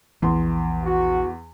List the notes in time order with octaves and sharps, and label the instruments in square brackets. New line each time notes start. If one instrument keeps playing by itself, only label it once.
[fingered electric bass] A#1 E3 [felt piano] E2 C6
[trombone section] F#4